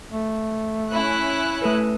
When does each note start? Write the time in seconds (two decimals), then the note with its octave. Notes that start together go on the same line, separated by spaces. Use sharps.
0.11 A3
0.91 C#4 E4 F#6
1.62 A3 A4 B4